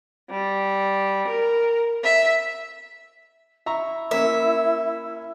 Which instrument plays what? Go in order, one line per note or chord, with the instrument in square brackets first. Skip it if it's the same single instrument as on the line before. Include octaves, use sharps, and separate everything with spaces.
[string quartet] G3
A#4
E5
[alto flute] E4 [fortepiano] E5 A#5 C#6
[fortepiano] A#3 C#4 [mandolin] E5